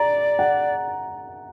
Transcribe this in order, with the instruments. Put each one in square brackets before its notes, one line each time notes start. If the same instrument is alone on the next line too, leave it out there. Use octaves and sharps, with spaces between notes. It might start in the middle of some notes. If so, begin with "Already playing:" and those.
Already playing: [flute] D5 [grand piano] A#5
[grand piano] F#5